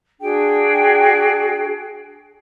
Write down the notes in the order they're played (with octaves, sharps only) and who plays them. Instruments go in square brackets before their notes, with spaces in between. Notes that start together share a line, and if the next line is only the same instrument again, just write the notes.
[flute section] D4 F#4 G#4 G5